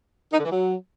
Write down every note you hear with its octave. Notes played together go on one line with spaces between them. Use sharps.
D#4
D3
E3
F#3